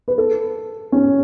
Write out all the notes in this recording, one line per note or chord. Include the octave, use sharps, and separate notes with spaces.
B4
A4
C#4